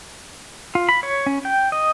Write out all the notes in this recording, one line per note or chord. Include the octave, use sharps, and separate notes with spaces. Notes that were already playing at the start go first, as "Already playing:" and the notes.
F4
B5
C#5
C#4
G5
D#5